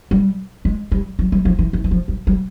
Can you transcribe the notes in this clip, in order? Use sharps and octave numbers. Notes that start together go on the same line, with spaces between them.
G3
G#3
G3
F#3
G3
F3
E3
E3
E3
F3
G3
G3